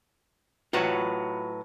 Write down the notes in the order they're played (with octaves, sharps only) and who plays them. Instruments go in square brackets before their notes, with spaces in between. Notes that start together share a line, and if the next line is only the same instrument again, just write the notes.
[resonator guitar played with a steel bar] A2 F#3 B4 [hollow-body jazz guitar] F4 F#4 C#5